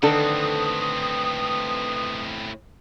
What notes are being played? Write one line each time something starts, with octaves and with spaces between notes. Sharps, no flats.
A2 D3 D#3 C4 A4 B4 D#6